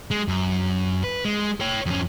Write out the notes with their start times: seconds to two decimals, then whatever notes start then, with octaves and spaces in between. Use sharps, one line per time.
0.11 G#3
0.28 F#2
1.04 B4
1.25 G#3
1.61 C#5 G5
1.86 F2 C#4